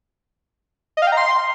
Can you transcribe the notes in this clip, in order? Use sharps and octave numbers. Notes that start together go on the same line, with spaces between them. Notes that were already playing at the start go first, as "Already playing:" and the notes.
D#5
F5
G5
A#5
C6